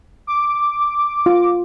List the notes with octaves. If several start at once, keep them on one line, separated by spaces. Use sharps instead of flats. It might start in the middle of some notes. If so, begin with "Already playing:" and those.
D6
F4